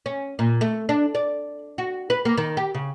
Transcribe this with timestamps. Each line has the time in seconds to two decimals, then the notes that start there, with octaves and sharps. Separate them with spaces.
0.06 C#4
0.39 A#2
0.61 A3
0.89 D4
1.15 D5
1.78 F#4
2.10 B4
2.25 A#3
2.38 D#3
2.57 G4
2.75 C#3